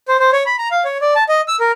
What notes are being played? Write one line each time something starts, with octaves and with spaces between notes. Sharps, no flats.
C5
C5
C#5
B5
A#5
F5
C#5
D5
A5
D#5
E6
A#4